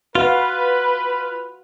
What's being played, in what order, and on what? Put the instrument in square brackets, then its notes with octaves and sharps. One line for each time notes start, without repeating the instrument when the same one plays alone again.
[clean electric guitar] F4 [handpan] F#4 F5 [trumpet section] B4